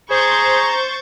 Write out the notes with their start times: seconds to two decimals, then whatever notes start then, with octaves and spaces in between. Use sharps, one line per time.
0.11 G#4 C5 A#5 C#6 G6 A6